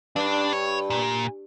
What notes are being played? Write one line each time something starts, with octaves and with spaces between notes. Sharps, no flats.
G2 D4
C#5
A#2